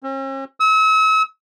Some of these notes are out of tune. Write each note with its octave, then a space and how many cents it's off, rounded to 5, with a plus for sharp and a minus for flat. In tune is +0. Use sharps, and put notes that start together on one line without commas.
C#4 -45
E6 -40